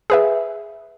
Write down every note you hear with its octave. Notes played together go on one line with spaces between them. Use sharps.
G#4 B4 E5